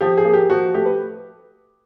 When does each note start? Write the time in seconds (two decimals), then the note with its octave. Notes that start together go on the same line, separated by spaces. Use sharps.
0.01 F3 G4
0.17 G#4
0.25 A#3
0.33 G4
0.50 F3 F#4
0.74 A3 G4
0.86 B4